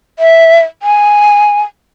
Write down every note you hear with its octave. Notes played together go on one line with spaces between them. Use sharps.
E5
G#5